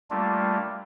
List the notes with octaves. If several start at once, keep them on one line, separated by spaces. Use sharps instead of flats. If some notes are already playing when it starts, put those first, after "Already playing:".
G3 A3 A#3 D4 F4